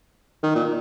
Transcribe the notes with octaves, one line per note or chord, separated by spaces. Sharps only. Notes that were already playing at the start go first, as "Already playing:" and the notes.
D#3
A#2